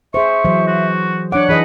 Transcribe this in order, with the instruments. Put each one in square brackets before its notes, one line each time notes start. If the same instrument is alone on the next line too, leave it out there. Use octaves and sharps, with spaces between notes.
[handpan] G#4 C5 [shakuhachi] E5 [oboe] C#6
[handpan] E3 F#3 C5
[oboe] F#4
[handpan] D4 F#5 [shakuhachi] C#5 [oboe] D6
[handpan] E3 G#4 D#5 [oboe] B4